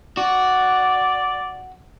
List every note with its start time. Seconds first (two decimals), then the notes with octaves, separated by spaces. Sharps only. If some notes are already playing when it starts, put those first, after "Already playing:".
0.17 F#4 D5